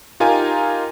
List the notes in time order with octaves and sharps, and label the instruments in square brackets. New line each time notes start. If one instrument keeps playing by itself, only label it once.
[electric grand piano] D#4 F4 G4 A#4 G#5